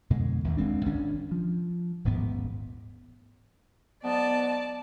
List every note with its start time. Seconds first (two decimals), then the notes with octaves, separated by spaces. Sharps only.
0.10 F2 B2 D3 G#3
0.44 A1 D#2
0.57 D1 G#3 C4 D4
0.86 G#1 C#4 D4
1.31 F3
2.05 D#1 A1 G#2 B3
4.04 G#2 F#3 B3 D5 A5